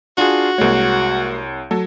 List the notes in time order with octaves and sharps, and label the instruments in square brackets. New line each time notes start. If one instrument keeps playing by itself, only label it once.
[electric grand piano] D4 F4 G#4 [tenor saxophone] F#4
[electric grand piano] C2 C#5 [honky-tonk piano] G#3 A#3
[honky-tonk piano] F#3 [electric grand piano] A4